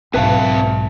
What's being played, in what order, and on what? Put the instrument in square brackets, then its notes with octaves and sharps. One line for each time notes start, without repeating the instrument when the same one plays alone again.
[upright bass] B1 G#2 [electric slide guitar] C4 E5 A5 [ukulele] B4 F5